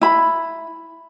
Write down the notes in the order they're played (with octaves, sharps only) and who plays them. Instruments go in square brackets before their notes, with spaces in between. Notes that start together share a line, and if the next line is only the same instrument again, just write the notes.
[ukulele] E4 B5